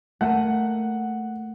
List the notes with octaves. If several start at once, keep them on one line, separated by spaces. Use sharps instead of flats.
A3 A#3 F#5 D#7